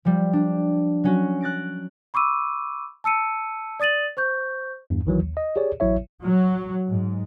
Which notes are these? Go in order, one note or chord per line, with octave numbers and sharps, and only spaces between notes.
F3 G3
D4
F#3 C#4 F#4
F#6 A6 A#6 D7
B5 C#6 D6 E6 D#7
A5 E6 C#7 D#7
D5 D#6 A6 D#7 F#7
C5 C#6 G6
E2 G2
A#1 D#3 E3 F#3
D#2
D#5
G4 G#4 C#5 D5
A1 F#3 E4 C#5 E5
F#3
G#2